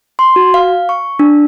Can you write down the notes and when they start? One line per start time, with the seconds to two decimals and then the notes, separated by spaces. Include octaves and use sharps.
0.19 C6
0.36 F#4
0.54 F5
0.89 C#6
1.19 D4